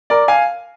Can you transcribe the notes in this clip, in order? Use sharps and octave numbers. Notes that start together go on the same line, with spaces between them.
A#4 D5
F5 G#5